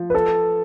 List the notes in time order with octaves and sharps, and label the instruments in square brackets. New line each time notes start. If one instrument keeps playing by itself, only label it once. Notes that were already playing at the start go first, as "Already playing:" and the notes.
Already playing: [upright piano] F3
[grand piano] B4
A4